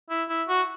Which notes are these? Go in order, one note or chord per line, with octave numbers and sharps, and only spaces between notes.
E4
E4
F#4